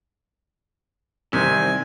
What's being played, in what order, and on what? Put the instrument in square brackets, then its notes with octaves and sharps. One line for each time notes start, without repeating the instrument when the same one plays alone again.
[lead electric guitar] C2 [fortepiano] C3 D#3 [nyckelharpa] G#5